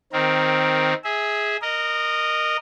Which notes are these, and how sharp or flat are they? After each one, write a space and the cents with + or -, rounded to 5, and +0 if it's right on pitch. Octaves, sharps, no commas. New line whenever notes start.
D#3 +0 C4 +0 A#4 +15
G#4 +0 E5 -25
A#4 +0 D#5 -20